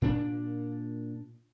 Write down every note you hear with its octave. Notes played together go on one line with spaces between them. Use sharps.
A#2 D4